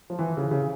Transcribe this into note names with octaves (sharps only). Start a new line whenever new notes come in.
F3
E3
C#3
C#3